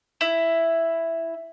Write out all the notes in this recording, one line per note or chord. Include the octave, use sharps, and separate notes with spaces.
E4